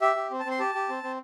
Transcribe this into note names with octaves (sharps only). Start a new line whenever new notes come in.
G4 E5
G4
C4
A5
C4
C6
G4 A5
G4
C4
C4